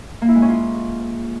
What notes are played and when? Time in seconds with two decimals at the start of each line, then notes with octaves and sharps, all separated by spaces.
0.22 A#3
0.28 E4
0.35 G#3
0.42 C#4
0.49 F4